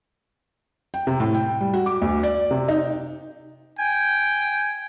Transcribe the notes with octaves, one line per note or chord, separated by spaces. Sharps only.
G5
C3
A2
G5
G3
F#4
D6
D2
D5
C3
D#4
G5 G#5